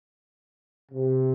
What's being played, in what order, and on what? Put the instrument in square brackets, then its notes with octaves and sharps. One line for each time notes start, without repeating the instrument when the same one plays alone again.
[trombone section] C3